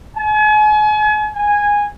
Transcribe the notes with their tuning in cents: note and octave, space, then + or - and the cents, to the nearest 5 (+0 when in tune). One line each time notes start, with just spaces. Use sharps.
G#5 +40
G#5 -10